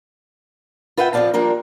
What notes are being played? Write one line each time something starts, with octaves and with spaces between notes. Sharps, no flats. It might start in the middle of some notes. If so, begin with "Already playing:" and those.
F4 B4 E5 F#5 G5
F2 F3 A3 D5 F5 A5
F3 G3 A#3 D4 A#4